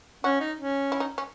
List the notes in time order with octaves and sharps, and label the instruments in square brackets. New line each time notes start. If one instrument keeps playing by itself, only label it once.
[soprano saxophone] C#4 [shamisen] F#4
[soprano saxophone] D#4
C#4
[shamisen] E4
D#4
C#4